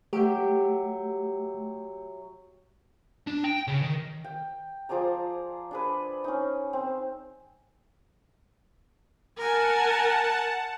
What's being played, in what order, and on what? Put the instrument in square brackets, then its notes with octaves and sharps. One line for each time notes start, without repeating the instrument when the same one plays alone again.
[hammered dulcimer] F#3 E5 G5 [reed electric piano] A3 [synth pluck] G4
[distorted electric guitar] D4
G5
C#3
D#3
[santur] G5
F3 G#4 D5 A#5
D4 G#4 B4
C#4 D#4
C4
[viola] A#4 G#5 [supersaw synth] F#5 A5